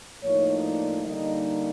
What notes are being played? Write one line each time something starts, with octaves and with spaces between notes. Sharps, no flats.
A2 F3 A#3 D#4 C#5
D5
D3 G3 A#3 D#4 D#5